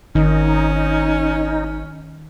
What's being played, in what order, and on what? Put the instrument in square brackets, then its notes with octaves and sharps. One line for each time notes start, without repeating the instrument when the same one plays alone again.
[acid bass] G#1 [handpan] D#3 [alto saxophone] C#4 [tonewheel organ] D#4